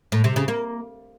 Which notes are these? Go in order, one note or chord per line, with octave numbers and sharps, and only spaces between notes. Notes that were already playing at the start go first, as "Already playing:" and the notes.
A2
C3
C#3
A#3